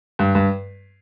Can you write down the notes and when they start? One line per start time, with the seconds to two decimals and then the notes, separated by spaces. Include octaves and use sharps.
0.19 G2
0.35 G2